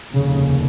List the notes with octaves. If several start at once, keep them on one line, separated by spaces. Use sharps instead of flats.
F1 D#2 C#3